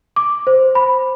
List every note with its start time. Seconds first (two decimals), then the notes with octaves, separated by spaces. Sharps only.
0.16 D6
0.47 C5
0.75 B5